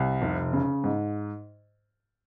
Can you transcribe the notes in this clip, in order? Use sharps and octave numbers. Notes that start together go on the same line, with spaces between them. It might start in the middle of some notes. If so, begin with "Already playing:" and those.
Already playing: C2
F1
C#3
G#2